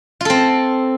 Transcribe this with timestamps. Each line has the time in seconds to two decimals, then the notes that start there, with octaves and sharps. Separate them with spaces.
0.21 F4
0.25 A4
0.30 C4